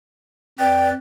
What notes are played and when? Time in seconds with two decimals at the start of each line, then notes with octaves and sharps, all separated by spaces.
0.59 F2 B4 D5 G5